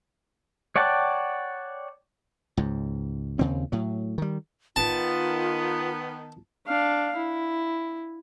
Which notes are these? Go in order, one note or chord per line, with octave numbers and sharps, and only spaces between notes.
C#5 D5 F#5 G5 A5
C#2 G#2
D#2 C#3 C4
A2 F#3
D#3 G3
D#3 B3 F4 A5
D4 F5
E4